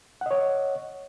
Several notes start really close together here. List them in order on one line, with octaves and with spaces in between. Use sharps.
F#5 D#5 C#5